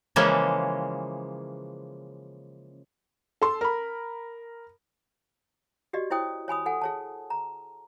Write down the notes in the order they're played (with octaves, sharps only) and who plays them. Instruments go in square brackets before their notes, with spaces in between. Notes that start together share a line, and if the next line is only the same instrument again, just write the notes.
[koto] C#3 E3 F3 G#3 A#3 C#4
[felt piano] A4 C6
A#4 B5
[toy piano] F#4 G4 D5 D#5
E4 C5 C#5 G5 D#6
C#5 G#5 B5 D#6
A4 F#5 G#5
G#4 C#5 A5
A#5